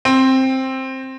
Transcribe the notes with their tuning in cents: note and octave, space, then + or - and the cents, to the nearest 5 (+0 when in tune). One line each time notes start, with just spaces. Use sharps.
C4 +10